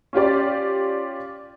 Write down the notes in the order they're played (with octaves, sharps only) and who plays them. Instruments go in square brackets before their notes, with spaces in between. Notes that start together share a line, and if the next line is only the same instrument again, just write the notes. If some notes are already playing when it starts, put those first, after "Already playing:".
[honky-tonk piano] C#4 F4 G4 D5